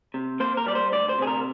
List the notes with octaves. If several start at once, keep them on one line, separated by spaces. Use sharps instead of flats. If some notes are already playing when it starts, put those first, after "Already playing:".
C3
A#3 C5
A#4
G3 D5
C5
D2 D5
C5
C3 G#4
A#4